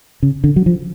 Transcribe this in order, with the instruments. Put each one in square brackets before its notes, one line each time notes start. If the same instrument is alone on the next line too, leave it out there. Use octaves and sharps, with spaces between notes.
[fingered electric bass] C#3
D3
F#3
F3